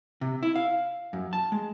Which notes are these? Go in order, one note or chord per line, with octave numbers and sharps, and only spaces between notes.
C3
E4
F5
F#2
A5
G#3